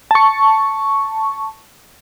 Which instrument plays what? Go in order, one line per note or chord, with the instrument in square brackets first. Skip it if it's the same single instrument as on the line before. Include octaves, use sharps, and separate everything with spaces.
[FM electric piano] A5 C#6